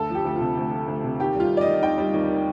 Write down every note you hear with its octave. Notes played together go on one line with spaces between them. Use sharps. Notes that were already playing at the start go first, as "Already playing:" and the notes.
Already playing: D2 A4
F3 G4
D2 G4
C3 F4
D2
F3
D2
C3
D#2 G4
G3
F4
D#2
D5
D#5
D#3
D#2 G5
G3
D#2
D#3